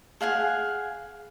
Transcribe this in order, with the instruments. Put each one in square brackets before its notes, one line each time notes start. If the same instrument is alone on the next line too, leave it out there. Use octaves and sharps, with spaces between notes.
[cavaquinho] G#4 F5 F#5 G#5